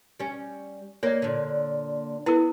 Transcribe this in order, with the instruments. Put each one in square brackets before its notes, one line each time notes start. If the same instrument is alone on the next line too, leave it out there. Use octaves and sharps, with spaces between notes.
[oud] G3 C#4
[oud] A#3 A#4 [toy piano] C#5 D5
[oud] A#2 D3
[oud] B3 [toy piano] E4 A#4